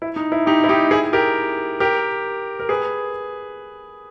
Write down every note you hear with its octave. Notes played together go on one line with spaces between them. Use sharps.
E4
D#4
E4
D#4 G4
E4
D#4 G4
E4 G#4
G4 A#4
G4 A#4
A#4
G#4 B4